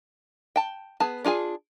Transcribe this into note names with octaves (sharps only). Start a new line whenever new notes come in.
G5 A5
B3 G#4 A5
D4 F4 G#4 G#5